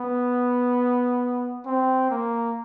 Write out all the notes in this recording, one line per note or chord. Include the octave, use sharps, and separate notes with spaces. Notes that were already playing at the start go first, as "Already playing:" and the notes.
Already playing: B3
C4
A#3